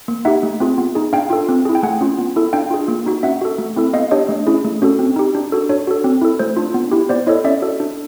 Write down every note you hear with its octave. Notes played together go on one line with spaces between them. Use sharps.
A#3
D#4 G4 E5 F#5
A3
C4 F4 G#4
B3
D#4 G#4
D4 F5 G5
F4 A4
C4
E4 G#4
G5
A3 F#5 G#5
C#4 F4
B3
E4 A4
D4 F5 G5
F4 G#4
A#3
D#4 F#4
C#4 E5 F#5
F#4 A4
A3
C4 E4 A4
B3 D#5 F5
D4 G4 C#5 D#5
A3
C#4 E4 G#4
A3
C#4 F#4 A4
C4
D#4 G4
D4
F#4 A4
D4 C#5
F#4 A4
C4
E4 A4
A3 C5
D4 F4
B3
E4 G4
B3 C5 D5
E4 A4 C#5 D#5
C#4 D5 E5
F#4 A4
D4